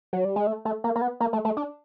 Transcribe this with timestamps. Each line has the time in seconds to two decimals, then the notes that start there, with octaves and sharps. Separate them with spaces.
0.13 F#3
0.25 G3
0.36 G#3
0.47 A3
0.65 A3
0.84 A#3
0.96 A#3
1.01 B3
1.20 A#3
1.33 A3
1.45 A3
1.57 D4